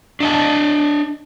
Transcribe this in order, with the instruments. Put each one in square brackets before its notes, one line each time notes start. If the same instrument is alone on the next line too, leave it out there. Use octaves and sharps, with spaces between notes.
[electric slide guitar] D4 D#5 A5